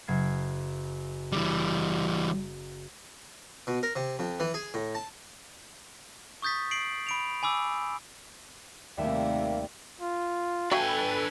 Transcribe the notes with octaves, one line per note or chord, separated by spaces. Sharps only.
F#1 G#6 C7
E3 G3
B2
A#4
C3
F2
E3
G#4
A2
A5
C#6 D#6 G6 A6 B6
C7 D7 F#7
B5 D7 F7
G#5 B5 D6 E6
D#2 C3 G3 A3 A#3 E5
F4
D4 F#4 A4 B4 E5 F5 G5 G#5